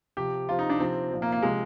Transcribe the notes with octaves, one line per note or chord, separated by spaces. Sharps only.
C3 F3 G4
C3 F3 F4
D#4
D4
C3 F3 C4
A#2 F3
A#3
A#3
C3 F3 G#3